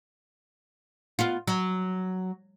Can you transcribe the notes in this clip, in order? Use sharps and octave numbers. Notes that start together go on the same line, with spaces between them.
B3 F4
F#3